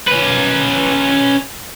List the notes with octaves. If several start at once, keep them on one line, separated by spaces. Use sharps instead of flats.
C#4 B4